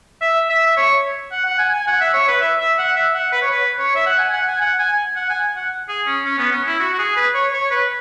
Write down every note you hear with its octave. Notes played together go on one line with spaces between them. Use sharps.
E5
E5
E5
C#5
F#5
F#5
G#5
G#5
F#5
E5
C#5
B4
E5
E5
F#5
E5
F#5
B4
C#5
B4
C#5
E5
F#5
G#5
F#5
G#5
F#5
G#5
F#5
G#5
F#5
G#4
C#4
C#4
B3
C#4
E4
F#4
F#4
G#4
B4
C#5
C#5
B4